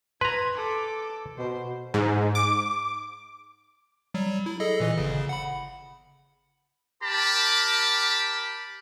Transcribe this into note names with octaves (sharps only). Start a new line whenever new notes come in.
B4 A#5 C6 G#6
A4 D6
B2 C5
G#2
D6
F#3 G3
E4
G#4 A4 D#5
A#2 E3 D#5
G1 C#3
F#5 B5
G4 A#4 G5 A5 B5 D6